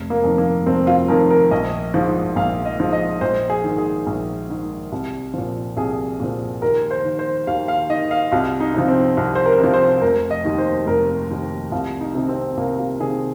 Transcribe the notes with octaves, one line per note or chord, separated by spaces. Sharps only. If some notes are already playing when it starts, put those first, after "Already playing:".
Already playing: F1
A#3
F2 D#3
A#3
F1 C4
F4
F2 D#3 A#4
A#4
A#1 D#5
G#2 F3
A#1 F5
D#5
G#2 F3
D#5
A#1 C5
G#4
G#2 D#3
G#4
A#1
G#2 D#3
C2
A#2 F3
C2 G#4
A#2 F3
D#2 A#4
C5
D#3
C5
D#2 F5
F5
D#3 D#5
F5
C2 F4
D#4
C3 F3
C4
C2
C5
A#4
C3 F3
C5
F1 A#4
D#5
D#2 D#3
C5
F1 A#4
D#2 D#3
C2 F4
D#4
C3 D#3
C4
C2 A#3
F4
C3 D#3 G#4